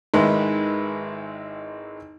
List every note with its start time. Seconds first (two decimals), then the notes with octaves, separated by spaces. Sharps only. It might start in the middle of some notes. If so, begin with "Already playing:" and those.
0.14 G#1 D#3 G#3 E4 B4 C6